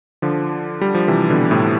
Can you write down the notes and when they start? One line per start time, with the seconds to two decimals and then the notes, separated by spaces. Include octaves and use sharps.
0.22 D3 F3
0.81 G3
0.95 F3
1.08 C3 E3
1.30 B2 D3
1.51 A2 C3